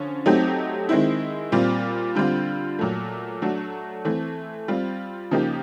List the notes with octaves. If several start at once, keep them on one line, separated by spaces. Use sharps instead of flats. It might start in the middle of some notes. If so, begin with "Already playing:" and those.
Already playing: D3 F3 C#4
F#3 A3 C4 D#4 G4
D#3 G#3 C4 E4
A#2 G3 C4 F4
D3 G3 C4 F4
A#2 F#3 A3
F#3 A3 D4 F#4 A4
E3 A3 C4
G3 C4 F4
C#3 F3 A#3 D#4 G4